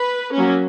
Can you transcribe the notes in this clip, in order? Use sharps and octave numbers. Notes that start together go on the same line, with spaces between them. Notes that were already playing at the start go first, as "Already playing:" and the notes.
Already playing: B4
F#3 A#3 C#4